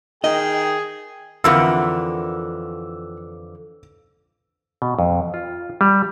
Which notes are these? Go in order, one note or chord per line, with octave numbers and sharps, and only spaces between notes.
D#3 G#4 D#5 G5
F2 D3 E3 F4 A#4 F#5 E6
B2
F2
F4
G3